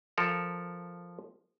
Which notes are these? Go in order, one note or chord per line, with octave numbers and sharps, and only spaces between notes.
F3 A4 A#4